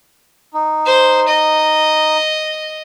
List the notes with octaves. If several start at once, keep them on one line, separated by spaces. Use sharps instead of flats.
D#4
C5
D#5